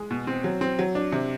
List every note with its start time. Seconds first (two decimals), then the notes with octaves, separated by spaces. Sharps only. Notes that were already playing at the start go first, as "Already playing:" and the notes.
Already playing: G#3
0.11 B2
0.27 C4
0.44 F#3
0.61 C4
0.79 F#3
0.95 D4
1.12 C3